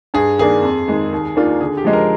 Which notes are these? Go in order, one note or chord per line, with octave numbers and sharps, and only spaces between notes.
G2 G#4
D#3 A#3 D4 G#4
F2
D#3 G#3
D#2
D#3 A#3 D4 F4
D3 G#4
G4
F3 G#3 D#4
A#4